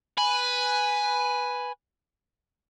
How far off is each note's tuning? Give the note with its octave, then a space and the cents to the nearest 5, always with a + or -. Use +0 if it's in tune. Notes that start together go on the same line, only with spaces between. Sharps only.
B4 +0 G#5 +0